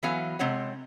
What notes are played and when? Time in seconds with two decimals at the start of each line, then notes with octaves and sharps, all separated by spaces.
0.03 E3 F#3 B3 F5 G#5
0.39 C3 G#3 C4 C#5 F#5